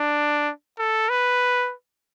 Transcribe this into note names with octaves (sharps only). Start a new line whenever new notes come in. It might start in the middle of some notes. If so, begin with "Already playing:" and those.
Already playing: D4
A4
B4